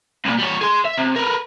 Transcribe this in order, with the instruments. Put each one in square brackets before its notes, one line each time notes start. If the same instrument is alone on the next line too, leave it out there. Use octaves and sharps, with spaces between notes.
[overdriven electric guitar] C2 A#2
G3 C#5
G#4 C6
E5
C3
A#4 B4